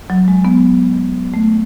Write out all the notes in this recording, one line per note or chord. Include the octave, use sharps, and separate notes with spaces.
F#3
G#3
B3
A3